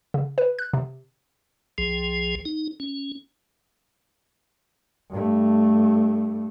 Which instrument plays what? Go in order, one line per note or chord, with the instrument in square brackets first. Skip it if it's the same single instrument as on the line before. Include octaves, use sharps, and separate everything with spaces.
[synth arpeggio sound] C#3
B4
F#6
C3
[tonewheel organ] C2 F3 G#4
D#4
C#4
[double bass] G2 A3